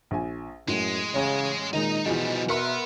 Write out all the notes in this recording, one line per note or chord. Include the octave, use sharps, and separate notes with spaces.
A#1 G#5
F#2 A2 G#3
A1 C#3 C#5
A#2 D#3 G#3 D#4 D#5 A#5
B2 E3 F3 G3 D#4 F#4 G#4
A#4 B4 E5 F#5 C6